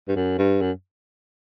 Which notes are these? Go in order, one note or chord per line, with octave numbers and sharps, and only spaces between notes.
G2
F#2
G2
F#2